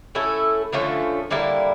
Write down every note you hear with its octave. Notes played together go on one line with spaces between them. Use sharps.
A3 C#4 E4 A4
D3 F3 A3 C#4
D3 G3 A#3 E4